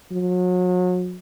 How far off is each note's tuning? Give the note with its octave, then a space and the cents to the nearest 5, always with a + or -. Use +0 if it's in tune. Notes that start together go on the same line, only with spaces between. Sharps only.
F#3 -35